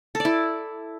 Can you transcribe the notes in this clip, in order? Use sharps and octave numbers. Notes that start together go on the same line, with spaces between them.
A4
D5
E4